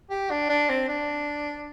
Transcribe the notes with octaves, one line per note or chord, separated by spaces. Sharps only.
G4
D4
D4
C4
D4